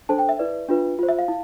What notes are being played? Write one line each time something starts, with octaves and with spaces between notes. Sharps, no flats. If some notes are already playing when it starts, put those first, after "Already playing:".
D4 A4 C5 A5
G5
E5
E4 B4 D5
D4 F4 B4
F4 C5
E5
F5
E4